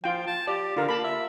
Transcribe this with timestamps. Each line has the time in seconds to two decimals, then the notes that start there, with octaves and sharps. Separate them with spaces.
0.04 F3 F4 G5
0.27 A5
0.48 G4 D5
0.77 D3 F4 A#4
0.89 A#3 A5 B5
1.04 E5